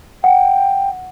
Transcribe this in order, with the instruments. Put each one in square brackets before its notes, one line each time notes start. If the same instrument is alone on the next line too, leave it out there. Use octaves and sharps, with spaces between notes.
[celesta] F#5 [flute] G5